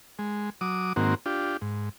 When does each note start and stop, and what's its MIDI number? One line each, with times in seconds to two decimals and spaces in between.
0.19 0.50 56
0.61 0.93 54
0.61 0.93 86
0.61 0.93 87
0.96 1.15 44
0.96 1.15 51
0.96 1.15 58
0.96 1.15 60
0.96 1.15 66
1.26 1.57 62
1.26 1.57 65
1.26 1.57 67
1.62 1.89 44